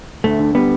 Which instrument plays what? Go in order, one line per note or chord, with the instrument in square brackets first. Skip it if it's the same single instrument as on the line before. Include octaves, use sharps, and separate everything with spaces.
[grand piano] D2 [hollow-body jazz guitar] A3
[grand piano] D3
[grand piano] G3 [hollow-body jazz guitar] B3